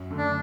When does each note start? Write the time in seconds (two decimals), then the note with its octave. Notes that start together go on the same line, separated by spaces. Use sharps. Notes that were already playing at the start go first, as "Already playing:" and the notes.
Already playing: F#2
0.11 D3 A3
0.18 D4